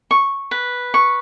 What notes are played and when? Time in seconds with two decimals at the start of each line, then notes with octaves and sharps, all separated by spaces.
0.11 C#6
0.51 B4
0.94 C#6